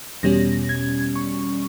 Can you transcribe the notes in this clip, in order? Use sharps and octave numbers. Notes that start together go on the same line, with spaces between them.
E2 B2 G3 C#4 A#6
G#6
C#6